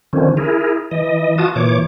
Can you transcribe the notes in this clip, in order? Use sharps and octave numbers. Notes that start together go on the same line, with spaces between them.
D3 D#3 F3 C4 C#4
E4 G#4 A#4
E3 D#5
F4 F#4 A5 D#6
A#2 E3 C#5 D6